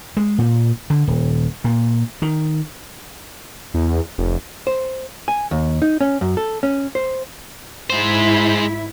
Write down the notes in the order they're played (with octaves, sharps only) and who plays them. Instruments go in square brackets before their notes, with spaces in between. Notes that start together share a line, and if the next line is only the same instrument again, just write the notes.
[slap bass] G#3
A#2
D3
D#1
A#2
D#3
[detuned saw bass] E2
F1
[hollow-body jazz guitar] C5
G#5
D#2
D#4
C#4
F#2
A4
C#4
C5
[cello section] G#2 E4 [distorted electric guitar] G#3 C5